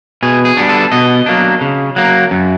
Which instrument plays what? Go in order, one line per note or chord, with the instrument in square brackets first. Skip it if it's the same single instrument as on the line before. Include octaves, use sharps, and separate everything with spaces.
[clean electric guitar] B2 G#4
G#4
G3 B3 D4
A4
B2 D#5
F#3 A#3 D4
C#3
F#3 A#3
F#2